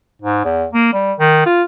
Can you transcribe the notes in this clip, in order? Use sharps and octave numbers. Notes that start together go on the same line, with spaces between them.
G#2
E2
A#3
G3
D#3
F4